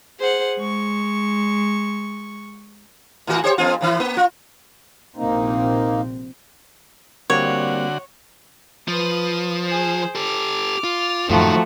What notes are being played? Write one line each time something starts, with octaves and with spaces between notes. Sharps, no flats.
G#4 C5 F#5
G#3 C#6
A2 E3 F#4
G4 C5 C#5
F2 B3 F4
A#2 E3 E4
A#3
F4
A#1 C3 A#3 C4 D#4
D3 G3 A#3 C4 F#4 C#5
F3 B4 D#6
G#4 C5
G4 A4 D6 F6
F4
F#2 A2 D#3 F3 A3 A#3 C4 F#4